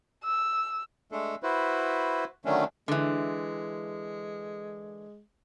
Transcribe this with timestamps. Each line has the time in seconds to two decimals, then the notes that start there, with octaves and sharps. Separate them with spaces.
0.24 E6
1.12 G#3 A3 D4 A4
1.43 E4 F#4 B4 C5
2.45 D3 D#3 F#3 A3 C#4 D4
2.88 D3 E3 G#3